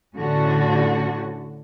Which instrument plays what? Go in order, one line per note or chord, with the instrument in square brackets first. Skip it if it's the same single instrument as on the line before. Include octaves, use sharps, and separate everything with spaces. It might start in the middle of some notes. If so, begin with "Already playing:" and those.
[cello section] A2 D3 C#4 F#4